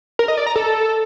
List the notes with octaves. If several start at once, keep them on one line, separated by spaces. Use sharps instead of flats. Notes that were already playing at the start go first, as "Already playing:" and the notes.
A#4
D#5
D5
A#5
A4